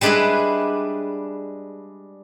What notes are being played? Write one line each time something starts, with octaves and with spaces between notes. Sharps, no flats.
G3 G#3 D4 E4 G#4 B4